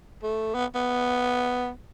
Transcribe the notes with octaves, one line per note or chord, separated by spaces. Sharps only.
A3
B3
B3